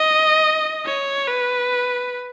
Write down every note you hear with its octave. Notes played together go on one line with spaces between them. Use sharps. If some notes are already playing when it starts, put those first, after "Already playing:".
Already playing: D#5
C#5
B4